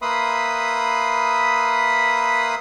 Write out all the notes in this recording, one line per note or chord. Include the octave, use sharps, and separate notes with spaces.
A#3 B4 E5 B5 C6 D#6